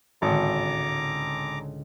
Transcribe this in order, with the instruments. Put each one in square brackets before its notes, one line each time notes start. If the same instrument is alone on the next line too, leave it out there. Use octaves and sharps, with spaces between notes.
[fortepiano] G#1 [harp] C#2 A2 D3 [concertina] A#5 D6